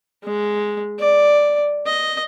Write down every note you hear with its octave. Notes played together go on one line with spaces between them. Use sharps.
G#3
D5
D#5